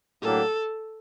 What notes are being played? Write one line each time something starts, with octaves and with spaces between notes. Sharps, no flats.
A2 F#3 A#3 D4 G4 A4